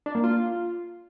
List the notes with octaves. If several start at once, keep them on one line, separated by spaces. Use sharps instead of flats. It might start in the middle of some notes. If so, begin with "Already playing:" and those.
D4
A#3
F4